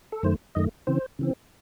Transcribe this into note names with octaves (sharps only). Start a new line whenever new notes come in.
A4
F#2 D#3 A3 C5
F#2 D#3 A3 D#5
C#3 E3 C4 C5
C#3 E3 C4